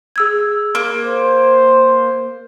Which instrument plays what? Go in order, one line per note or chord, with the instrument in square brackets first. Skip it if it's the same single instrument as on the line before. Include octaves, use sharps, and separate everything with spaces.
[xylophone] G#4 E6 G#6
[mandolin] A#3
[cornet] C5